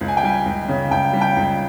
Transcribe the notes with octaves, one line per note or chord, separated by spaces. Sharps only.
C#2
G#5
G5
G3 G#5
C#2
C#3
C#2 G5
G3
G5
C#2